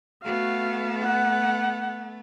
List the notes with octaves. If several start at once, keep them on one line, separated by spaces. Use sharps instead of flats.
A3 B3 F#4 F5
F#5